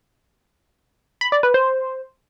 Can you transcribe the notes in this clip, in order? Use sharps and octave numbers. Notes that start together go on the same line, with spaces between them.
B5
D5
B4
C5